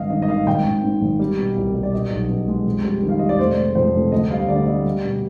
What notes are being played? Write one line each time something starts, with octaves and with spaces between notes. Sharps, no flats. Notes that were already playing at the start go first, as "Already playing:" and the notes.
Already playing: G#1 G2 D#5 F5
D#3 D#5
D#5
D#3 F5
G#1 G5
G#1
G#2
G#1
G3
B2
C2
G3
D5
B2 D#5
B1
B2
G#3
F2
G3
D#3
F5
G3 D#5
D5
F1 C5
G#3
F2 C5
F1
D2 D#5
G3 F5
D3 D5
G3 D#5
G3
B2